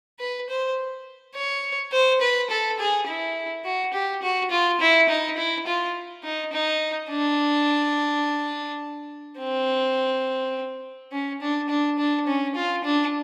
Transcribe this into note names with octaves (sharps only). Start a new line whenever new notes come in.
B4
C5
C#5
C5
B4
A4
G#4
E4
F#4
G4
F#4
F4
E4
D#4
E4
F4
D#4
D#4
D4
C4
C#4
D4
D4
D4
C#4
F4
D4